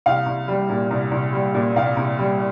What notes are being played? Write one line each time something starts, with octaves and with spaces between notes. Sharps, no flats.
C2 F5
C2
G3
A#2
C2
C2
G3
A#2
C2 F5
C2
G3